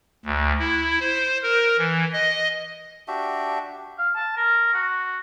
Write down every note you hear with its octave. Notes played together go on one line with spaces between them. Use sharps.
D2
E4
C5
A#4
E3
D#5
D4 F#4 G4 E5
F5
A5
A#4
F#4